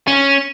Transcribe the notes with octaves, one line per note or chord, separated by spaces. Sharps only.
C#4